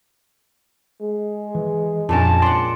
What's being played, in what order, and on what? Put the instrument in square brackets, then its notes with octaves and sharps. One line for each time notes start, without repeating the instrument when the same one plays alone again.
[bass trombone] G#3
[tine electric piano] E3
[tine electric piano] F2 D4 [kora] A#2 C#4 A#4 [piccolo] A5
[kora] D5 F#5 [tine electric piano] C6